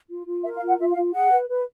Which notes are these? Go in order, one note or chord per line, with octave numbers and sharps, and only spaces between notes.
F4
F4
A#4 E5
F5
F4
F#5
F4 E5
F5
F4
G#4 F#5
B4
B4